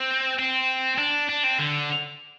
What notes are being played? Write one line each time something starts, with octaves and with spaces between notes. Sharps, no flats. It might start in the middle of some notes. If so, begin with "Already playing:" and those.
Already playing: C4
C4
D4
D4
C4
D3